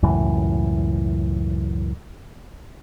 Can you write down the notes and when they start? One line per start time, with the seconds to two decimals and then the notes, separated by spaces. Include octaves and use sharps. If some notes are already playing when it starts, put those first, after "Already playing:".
0.03 C#2 F#2 A2 E3